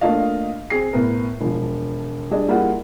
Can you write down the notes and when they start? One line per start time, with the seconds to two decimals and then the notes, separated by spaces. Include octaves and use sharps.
0.01 A3 A#3 D4 F4 D#5 F5
0.70 C4 G#4 C7
0.93 A2 B3 A#4
1.41 E1 F3
2.31 G3 D4 G#4 D5 D#5
2.48 G3 A#3 E4 F4 G#4 F#5